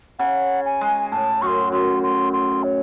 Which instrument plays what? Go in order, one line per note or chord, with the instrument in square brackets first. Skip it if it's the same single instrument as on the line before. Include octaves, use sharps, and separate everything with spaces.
[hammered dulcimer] C#3 [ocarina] F#5
[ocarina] G#5
[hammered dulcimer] G#3
[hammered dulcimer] A2 [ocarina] A5
[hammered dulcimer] F#2 [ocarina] C6 C#6
[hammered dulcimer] F#2 [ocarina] C6
[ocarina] C6
C6
C#5